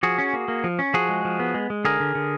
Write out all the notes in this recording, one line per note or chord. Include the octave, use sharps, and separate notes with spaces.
F3 F#4 G#4
C#4
A#3
A#3
F3
C#4
F3 F#4 G#4
G#3
F3
B3
G#3
G#3
D3 G#4 A#4
D3
D3